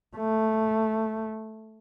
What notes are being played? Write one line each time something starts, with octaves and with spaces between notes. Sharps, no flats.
A3